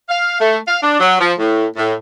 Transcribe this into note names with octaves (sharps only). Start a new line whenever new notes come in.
F5
A3
F5
D4
F#3
F3
A2
A2